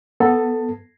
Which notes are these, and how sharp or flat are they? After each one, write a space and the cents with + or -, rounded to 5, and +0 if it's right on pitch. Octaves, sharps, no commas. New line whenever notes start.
B3 +0 A4 +0 A5 +15